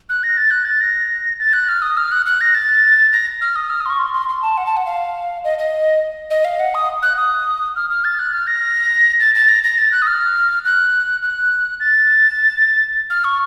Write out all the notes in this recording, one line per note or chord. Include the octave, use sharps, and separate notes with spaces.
F#6
A#6
A6
F#6
A6
A#6
A6
F#6
F6
D#6
F6
F#6
F#6
A#6
A6
A#6
F6
D#6
F6
D#6
C6
C#6
C6
C6
C6
A5
F#5
A5
F#5
F5
D#5
D#5
D#5
F5
F#5
D#6
F#6
D#6
F6
F6
A6
F#6
F6
A#6
A6
A6
A#6
A#6
A6
F#6
D#6
F6
F#6
F#6
A6
F6
C#6